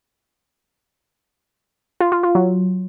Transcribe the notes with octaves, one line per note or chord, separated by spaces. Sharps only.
F4
F4
F4
F#3